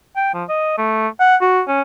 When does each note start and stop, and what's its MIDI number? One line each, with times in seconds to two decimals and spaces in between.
0.16 0.31 79
0.34 0.44 53
0.49 0.75 75
0.78 1.08 57
1.20 1.36 78
1.41 1.62 66
1.68 1.82 61